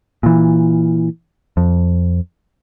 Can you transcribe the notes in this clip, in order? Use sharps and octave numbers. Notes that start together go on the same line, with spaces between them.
A#2 E3
F2